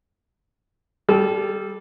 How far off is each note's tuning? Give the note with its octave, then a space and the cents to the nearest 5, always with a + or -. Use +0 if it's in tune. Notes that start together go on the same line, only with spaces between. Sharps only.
G3 -5 A4 -35